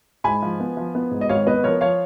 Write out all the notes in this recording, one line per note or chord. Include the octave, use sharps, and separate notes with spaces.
G#2 G#5 B5
F3
B3
F3
B3
G#2
D#5
G#1 C#5 F5
B3 B4 D#5
F3 A#4 C#5
F3 C#5 F5